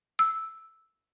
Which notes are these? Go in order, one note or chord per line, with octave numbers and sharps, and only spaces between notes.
E6